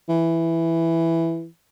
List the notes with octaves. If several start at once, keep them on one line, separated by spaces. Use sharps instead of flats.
E3